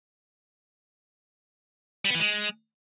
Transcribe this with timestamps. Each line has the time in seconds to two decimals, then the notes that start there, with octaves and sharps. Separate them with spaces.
2.05 G3
2.10 B3
2.15 E3
2.20 G#3